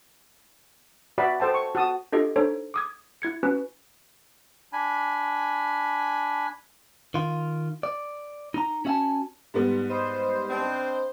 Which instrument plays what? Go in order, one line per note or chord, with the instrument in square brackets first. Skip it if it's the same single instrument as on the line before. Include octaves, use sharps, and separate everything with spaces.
[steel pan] F#4 B4 D5 E5 B5
A4 C5 G5 A5
C#6
F#4 A5 D#6
[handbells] D4 F4 G4 A4 D#5
D4 D#4 A4 C5 C#5
D6 D#6 G#6
E4 G#6 C#7
C#4 F#4 B4
[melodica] D4 G#5 B5
[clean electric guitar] D#3 F4
D5
D#4 A#5
C#4 F#4 E5 F5 G#5 A5
[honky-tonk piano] G#2 G3 B3
[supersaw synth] C5 [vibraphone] D#5 B5 D#6
[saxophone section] C4 D4